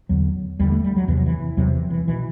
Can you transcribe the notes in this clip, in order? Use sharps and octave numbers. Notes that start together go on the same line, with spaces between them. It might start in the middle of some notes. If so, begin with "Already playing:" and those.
E2 D3 F#3
E2 D3 G3
A3
G3
F#3
E2 C3 E3
F#3
E3
E2 C3 F#3
E3
E3
B2 E3